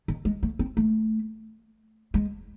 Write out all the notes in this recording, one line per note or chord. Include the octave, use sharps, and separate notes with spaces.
D#3
G#3
A3
C4
A3
G#3